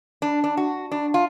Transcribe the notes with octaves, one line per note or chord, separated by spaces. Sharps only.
D4
D4
F#4
D4
F4